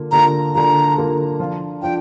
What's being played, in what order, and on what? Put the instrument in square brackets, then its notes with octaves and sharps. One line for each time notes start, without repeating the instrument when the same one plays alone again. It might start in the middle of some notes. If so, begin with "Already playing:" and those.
Already playing: [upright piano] D3 A#3 F4
[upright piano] D3 A#3 F4 [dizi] A#5
[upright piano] D3 A#3 F4 [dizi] A#5
[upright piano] D3 A#3 F4
F3 D4 F4
[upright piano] F3 D4 F4 [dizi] G5